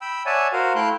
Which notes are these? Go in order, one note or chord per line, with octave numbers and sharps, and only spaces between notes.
G5 B5 E6
C#5 D5 E5 F#5 G#5 A5
F#4 A#4 C5 F5 F#5
A3 E4 F5 G5 C6 F#6